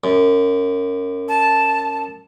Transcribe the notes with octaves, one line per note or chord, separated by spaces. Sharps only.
F#2
A5